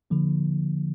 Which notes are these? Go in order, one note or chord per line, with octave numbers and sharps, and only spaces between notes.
D3 F3 A#3